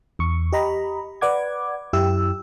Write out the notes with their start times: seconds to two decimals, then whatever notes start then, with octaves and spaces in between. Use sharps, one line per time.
0.19 E2 C#6
0.52 G4 D#5 A#5 B5
1.21 B4 D5 F#5 D6 G#6
1.93 F#2 E4 G4 E6